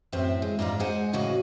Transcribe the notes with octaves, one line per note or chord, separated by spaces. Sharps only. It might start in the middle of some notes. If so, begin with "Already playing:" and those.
F#2 A2 C4 C5 E5
G#3
G#2 D4 F4 A#5
G#3 D#4 C5 F#5 G#5
A2 C#3 F#3 A#3 F#4 D#5